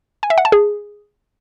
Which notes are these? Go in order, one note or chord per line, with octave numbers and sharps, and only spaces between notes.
G#5
E5
F#5
A5
G#4